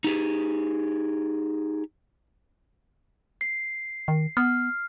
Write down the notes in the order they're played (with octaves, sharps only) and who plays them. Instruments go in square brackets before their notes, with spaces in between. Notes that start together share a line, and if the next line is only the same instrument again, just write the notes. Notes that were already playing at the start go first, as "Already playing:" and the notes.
[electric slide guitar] D#4 G4 G#4
[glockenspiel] C7
[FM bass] D#3
[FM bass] B3 [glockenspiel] F6